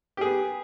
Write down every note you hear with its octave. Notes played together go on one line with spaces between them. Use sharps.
B3 G4 G#4